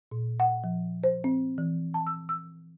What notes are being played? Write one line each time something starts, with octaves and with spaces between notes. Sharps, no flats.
A#2
F#5
F3
C5
C4
E3
A5
E6
E6